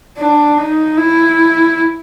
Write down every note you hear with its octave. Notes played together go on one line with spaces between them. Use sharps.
D4
D#4
E4